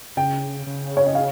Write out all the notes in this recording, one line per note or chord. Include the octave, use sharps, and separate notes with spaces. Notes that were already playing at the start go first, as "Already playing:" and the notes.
C#3 G5
C#3
C#5
D#5
F5